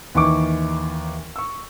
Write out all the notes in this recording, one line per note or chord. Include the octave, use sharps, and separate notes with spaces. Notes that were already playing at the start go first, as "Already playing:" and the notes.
D#2 E3 D#4 C#6 D6
C#6 E6